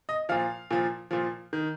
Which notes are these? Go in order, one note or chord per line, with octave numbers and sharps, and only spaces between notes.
D#5
A#2 F3 F5
A#2 F3
A#2 F3
D#3